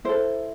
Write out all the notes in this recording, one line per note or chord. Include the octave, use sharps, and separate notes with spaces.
E4 A4 C5